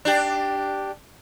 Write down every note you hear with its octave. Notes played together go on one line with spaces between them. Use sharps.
D4 G4